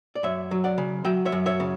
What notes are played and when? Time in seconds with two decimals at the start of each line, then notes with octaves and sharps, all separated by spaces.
0.15 D5
0.23 F#2 C#5 E5
0.51 F#3
0.64 D5 F#5
0.78 C#3
1.05 F#3 E5 G5
1.25 C#5 E5
1.32 F#2
1.46 C#5 E5
1.60 C#3